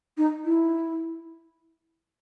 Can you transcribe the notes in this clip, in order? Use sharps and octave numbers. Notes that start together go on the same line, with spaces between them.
D#4
E4